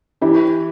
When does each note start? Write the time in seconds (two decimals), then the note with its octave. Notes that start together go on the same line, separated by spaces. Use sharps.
0.21 E3 E4 G4